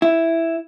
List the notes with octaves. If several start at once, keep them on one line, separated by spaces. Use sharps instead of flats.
E4